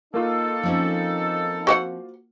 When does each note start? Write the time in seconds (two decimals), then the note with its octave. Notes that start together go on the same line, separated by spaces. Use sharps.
0.14 A#3 D#4 F4 A4
0.63 F3 C4 C#4
1.67 F#4 C5 F#5